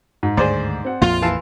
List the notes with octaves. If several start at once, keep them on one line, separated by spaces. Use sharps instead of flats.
G#2
D2 G2 D#3 G#4 C5 D5
C4 F#5
A#1 F2 A#3 F4
E3 F5 A5